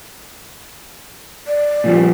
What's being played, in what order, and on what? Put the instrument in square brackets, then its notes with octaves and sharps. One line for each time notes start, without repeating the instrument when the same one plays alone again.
[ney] D5
[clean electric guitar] A#2 F3 G3